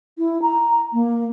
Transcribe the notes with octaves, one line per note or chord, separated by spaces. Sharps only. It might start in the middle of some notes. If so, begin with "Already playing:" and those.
E4
A#5
A#3